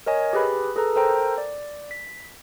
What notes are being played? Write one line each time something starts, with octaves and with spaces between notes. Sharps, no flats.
A#4 C#5 D#5 G#5
G4 G#4 B4 B5
G#4 A4 B4 A#5
A4 A#4 C5 G5 A#5
D5
B6